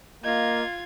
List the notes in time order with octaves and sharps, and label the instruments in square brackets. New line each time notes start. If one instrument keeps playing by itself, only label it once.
[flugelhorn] A#3 [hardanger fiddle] F4 [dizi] D#5 [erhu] G#6